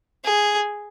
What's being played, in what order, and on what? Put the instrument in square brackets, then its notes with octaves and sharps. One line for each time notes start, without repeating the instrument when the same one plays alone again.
[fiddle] G#4